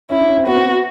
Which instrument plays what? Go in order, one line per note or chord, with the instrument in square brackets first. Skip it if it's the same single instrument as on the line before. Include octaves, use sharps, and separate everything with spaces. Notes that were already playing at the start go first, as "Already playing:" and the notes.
[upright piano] C#4 [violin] E4
[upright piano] D4
C#4
C4
[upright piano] B3 [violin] F#4
[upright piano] C4
B3